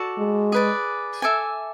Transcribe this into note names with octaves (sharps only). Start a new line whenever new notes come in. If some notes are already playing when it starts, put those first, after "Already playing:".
Already playing: F#4 A4 D5
G#3
G#4 B4 D5
A4 E5 G#5 D6